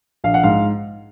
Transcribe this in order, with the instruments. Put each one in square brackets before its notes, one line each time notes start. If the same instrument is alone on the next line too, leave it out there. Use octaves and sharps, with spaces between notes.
[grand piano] A#1 F5
F#5
G#2 F5